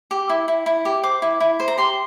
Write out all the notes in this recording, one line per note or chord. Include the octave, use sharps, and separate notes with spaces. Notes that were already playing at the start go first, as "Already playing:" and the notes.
G4
E4
E4
E4
G4
C5 D6
E4
E4
C5
A#5
G4 C6